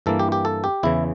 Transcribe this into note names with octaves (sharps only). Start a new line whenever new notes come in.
G2 E3 A#3 A4
G4
G4
A4
G4
E2 C#3 E3 E4